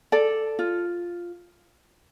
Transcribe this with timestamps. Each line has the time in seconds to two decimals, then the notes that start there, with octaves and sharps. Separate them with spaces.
0.12 A4 D5
0.59 F4